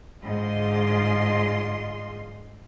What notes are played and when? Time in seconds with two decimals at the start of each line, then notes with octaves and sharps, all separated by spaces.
0.23 G#2 D3 F4 G#4 D#5 C6